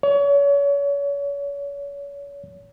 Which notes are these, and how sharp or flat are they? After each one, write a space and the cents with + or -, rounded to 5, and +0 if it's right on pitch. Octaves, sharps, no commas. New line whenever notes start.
C#5 +35